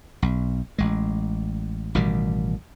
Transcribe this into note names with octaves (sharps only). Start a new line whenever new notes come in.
B1
A1 G#3
A1 B2 D#3 G3